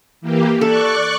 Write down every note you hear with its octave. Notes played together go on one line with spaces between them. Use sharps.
E3 A#3 G4
A4 D5 C#6 F#6